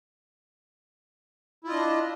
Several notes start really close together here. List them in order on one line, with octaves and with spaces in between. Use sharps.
E4 F4 D#5 D4